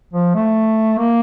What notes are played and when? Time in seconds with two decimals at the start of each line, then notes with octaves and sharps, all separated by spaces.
0.13 F3
0.35 A3
0.98 A#3